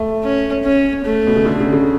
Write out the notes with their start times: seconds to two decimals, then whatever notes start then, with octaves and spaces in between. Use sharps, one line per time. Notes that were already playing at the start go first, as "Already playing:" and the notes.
Already playing: A3
0.23 C#4
0.64 C#4
1.05 A3
1.27 B2
1.36 C#3
1.46 D3
1.60 C#3
1.73 C#3